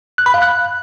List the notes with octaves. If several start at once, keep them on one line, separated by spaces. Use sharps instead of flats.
F#6
B5
F5
F#6